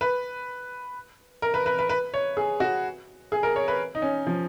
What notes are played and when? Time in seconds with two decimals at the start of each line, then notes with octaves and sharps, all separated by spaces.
0.01 B4
1.42 A#4
1.54 B4
1.66 B4
1.79 B4
1.89 B4
2.14 C#5
2.37 G#4
2.60 F#4
3.32 G#4
3.43 A#4
3.56 C#5
3.68 B4
3.95 D#4
4.02 C#4
4.27 F3